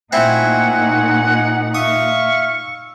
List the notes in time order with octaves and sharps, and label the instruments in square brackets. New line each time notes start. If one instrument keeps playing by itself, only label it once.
[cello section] A#2 D#4 [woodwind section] A3 G#5 [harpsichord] C4 E4 [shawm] F#5
[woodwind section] E5 F5 [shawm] C#6 [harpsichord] D#6